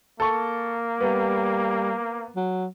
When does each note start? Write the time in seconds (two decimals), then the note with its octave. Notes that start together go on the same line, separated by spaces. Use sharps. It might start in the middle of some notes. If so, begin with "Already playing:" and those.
0.20 A#3 A4 C#6
1.01 G3 B3
2.36 F#3